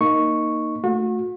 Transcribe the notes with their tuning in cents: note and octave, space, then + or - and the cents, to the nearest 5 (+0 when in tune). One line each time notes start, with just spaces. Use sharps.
A#3 +0 D#4 +0 C#6 +0
A3 +0 F#4 -40